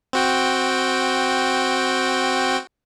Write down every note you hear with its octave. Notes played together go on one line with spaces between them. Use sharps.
C4 F#4 G5